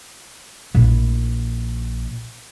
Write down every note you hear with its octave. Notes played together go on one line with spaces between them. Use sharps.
A#1 E4